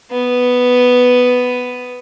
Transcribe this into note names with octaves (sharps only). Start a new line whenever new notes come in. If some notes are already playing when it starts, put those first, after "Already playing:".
B3